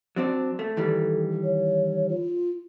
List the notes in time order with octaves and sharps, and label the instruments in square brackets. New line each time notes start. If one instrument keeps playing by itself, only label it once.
[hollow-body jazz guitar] F#3 C4 D4
A3
[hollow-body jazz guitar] D#3 E3 G3 [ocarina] A4
[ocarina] C#5
F4